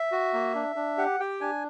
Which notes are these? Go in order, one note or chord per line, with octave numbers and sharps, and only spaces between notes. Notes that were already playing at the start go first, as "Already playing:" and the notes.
Already playing: E5
F#4
A#3
D4
D4
G4 F#5
G4 G5
D4 G#5